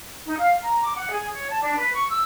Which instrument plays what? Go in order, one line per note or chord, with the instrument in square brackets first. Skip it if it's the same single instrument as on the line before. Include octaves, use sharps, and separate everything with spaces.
[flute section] D#4
F5
A#5
D6
F#5
G#4
C#5
A5
D4
B4
C#6
E6